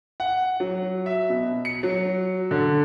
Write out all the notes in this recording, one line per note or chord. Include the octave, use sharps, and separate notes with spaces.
F#5
F#3
E5
B2
C#7
F#3
D3